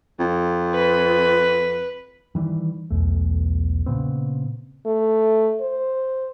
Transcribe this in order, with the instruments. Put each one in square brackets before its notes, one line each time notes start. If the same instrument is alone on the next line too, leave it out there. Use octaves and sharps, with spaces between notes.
[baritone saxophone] F2
[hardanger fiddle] B4
[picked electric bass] D#3 E3 G3
B1 E2 A3
A#2 C#3 B3 C4
[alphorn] A3
C5